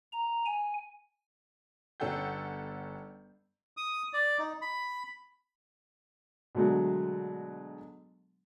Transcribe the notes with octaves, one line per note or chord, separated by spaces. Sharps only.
A#5
G#5
G1 C#4 A4 F#5 G5 G6
D#6
D5
D#4
B5
B2 D3 F#3 G#3 A3